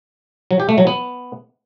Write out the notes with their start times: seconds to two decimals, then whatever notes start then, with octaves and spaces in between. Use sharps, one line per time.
0.51 F#3
0.60 G4
0.69 A3
0.78 F#3
0.87 B3